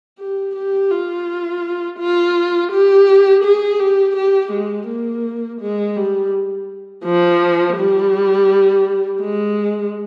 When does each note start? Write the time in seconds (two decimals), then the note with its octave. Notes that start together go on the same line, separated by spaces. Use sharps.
0.19 G4
0.56 G4
0.91 F4
1.99 F4
2.72 G4
3.44 G#4
3.80 G4
4.16 G4
4.52 G#3
4.88 A#3
5.61 G#3
5.96 G3
7.05 F3
7.77 G3
9.22 G#3